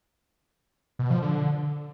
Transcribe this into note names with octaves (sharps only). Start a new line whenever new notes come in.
B2
F3
D3